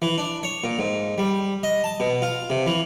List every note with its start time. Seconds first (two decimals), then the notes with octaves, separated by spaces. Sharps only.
0.02 E3
0.18 D4
0.43 C#5
0.64 A#2
0.79 G#2
1.18 G3
1.63 D#5
1.84 A5
2.00 B2
2.22 F4
2.50 C3
2.67 E3